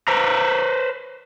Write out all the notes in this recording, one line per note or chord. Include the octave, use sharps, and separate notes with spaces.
B4 C5 A#5